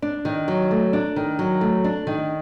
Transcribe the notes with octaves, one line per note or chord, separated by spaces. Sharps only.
D4
D#3
F#3
A3
D4
D#3
F#3
A3
D4
D#3